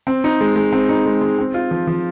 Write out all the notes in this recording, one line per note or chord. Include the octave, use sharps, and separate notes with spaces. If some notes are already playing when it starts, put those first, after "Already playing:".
C4
D#4
G#3
G#3
C4
D#4
G#3
G#3
C4
F4
F3
F3